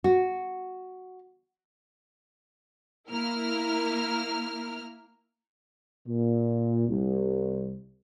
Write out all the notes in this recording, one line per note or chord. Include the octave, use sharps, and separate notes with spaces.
F#4
A#3 E4 A#4 F6
A#2
C2